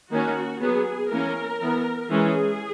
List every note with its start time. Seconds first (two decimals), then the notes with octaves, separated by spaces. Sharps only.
0.10 D#3 A#3 C#4 F#4
0.61 F#3 B3 G#4
1.11 E3 A#3 C#4 A#4
1.61 E3 B3
2.10 E3 G#3 C#4 G#4